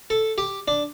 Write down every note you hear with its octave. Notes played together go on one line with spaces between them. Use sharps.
A4
G4
D4